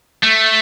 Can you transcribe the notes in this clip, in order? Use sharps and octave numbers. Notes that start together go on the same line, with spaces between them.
A3